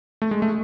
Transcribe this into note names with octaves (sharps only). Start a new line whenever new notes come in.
A3
G#3
A3